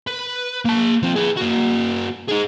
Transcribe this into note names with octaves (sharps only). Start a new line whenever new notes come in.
B4
A#3 A5
F3 C4
G#4 B4
A#3 F#4
D#4 G#4